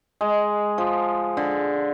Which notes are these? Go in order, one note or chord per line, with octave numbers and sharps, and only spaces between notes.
G#3
F3
D3